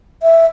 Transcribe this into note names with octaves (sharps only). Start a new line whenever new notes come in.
E5